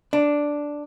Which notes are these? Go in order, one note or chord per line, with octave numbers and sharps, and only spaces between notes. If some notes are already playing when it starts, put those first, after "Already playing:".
D4